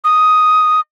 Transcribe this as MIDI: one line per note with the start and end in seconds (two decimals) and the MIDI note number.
0.04 0.80 87